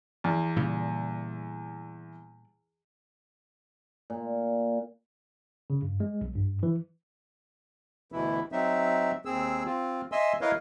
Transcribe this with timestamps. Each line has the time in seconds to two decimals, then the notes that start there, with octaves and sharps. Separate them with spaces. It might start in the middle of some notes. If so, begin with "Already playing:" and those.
0.24 E2
0.56 A#2 C#3 G3
4.10 A#2
5.70 C#3
5.82 G2
6.00 G#3
6.21 B1
6.35 G2
6.63 E3
8.12 D2 B2 E3 E4
8.52 F#3 C4 D#4 E5
9.25 D#2 C4 G#4 E6
9.65 C4 F4
10.12 D#5 E5 G#5 C6 E6
10.41 E4 A#4 B4 C#5 D#5 F5